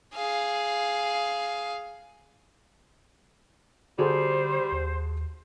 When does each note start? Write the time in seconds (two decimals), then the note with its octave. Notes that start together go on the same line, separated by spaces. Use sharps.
0.15 G#4 F5
3.99 D3 G3 F#4 G#4 A4 C5
4.72 D#2